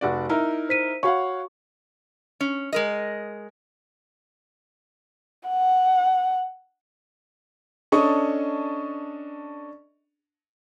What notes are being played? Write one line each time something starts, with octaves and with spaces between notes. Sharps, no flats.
F1 F#4 D5
D#4 E4 A#4
C5 B6 D#7
F#4 C#5 F5 F#5 C#6
C#4
G#3 A#4 D#5
F#5
C#4 D4 A4 D#5 C#6 D#6